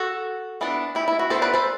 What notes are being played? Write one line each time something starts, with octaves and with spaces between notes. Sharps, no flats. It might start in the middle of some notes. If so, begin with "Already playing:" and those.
Already playing: F#4 A4
E3 B3 D4
E4 G4
E4
F#4
E3 B3 D4 A4 C5
B4 D5
A4 C5